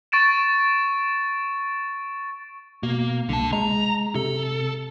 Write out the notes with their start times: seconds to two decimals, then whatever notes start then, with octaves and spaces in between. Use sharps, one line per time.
0.12 C#6 A6 D7 E7
2.83 B2 A#3
3.29 C2 D3 A5
3.53 G#3 A#5
4.15 C3 A4